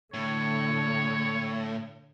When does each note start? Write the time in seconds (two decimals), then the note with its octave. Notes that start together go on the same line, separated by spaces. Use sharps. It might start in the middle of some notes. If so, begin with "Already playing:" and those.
0.14 A2 D3 C#5